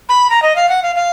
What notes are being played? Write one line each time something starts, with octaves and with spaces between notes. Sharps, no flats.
B5
A#5
D#5
F5
F#5
F5
F5